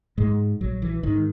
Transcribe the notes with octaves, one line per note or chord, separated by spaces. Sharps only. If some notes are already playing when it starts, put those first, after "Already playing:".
G#2 G#3
A#1 F#3
E3
G#2 D#3